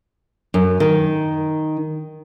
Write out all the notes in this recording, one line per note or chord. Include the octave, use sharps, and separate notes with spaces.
F#2
D#3